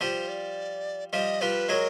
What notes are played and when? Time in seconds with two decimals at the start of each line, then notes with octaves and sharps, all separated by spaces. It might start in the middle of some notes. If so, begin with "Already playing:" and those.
0.01 F3 G3 C5
0.29 D5
1.13 F3 G3 D#5
1.41 F3 G3 B4
1.69 F#3 G#3 A#4 B4